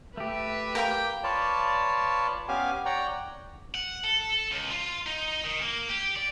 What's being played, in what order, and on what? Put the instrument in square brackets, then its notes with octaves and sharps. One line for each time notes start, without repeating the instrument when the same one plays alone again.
[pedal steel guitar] A3 G4 [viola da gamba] B4 [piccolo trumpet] E5
[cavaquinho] A#4 F5 D6 [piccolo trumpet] G5
[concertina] F4 B4 C#5 D5 A5
B3 C#4 G4 F5 G#5
C#5 D5 F#5 G5 A#5
[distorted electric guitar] F#5
A4
C#2
F4
D#4
D#3
A#3
G4
D5